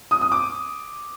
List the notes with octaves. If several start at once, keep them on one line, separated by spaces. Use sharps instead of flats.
D#6
D#6
D6